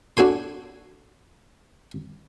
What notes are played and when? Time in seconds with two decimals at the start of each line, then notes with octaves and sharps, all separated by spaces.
0.17 D4 F#4 A4 G#5 C6